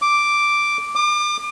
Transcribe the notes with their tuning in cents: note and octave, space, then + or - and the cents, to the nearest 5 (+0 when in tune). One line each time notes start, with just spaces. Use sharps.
D6 +0
D6 +35